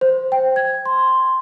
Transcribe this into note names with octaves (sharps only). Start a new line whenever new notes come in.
C5
G5
G#6
C6